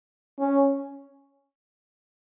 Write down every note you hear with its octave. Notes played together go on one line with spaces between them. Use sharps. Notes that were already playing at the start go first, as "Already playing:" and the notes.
C#4